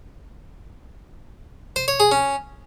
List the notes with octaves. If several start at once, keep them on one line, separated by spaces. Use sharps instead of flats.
C5
C#5
G#4
C#4